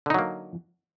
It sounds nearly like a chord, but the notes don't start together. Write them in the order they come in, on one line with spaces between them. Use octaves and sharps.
D3 D#4 F#3 A#3